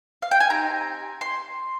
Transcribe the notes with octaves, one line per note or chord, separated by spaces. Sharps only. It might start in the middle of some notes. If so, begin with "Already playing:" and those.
F5
G5
G#5
C4 D#4 G4 A#5
C6